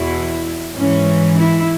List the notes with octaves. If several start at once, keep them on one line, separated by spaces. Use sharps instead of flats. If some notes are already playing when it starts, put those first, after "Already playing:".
Already playing: E2 B2 E4
G#2 E3 C#4
E4